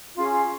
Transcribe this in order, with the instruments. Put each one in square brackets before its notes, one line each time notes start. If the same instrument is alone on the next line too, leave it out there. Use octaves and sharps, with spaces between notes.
[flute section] C#4 F4 G#4